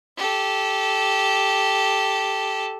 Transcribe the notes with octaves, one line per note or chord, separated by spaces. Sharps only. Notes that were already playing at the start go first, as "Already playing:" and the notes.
G4 A4